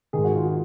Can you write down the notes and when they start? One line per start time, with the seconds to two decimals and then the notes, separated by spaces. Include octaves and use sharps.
0.13 G#2 D#3 G#4
0.24 F#4
0.35 F4
0.46 F4